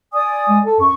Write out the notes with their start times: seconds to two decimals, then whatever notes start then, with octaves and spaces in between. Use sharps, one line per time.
0.13 D5 G#5 D#6
0.49 G#3
0.65 A4
0.80 F#2 C#6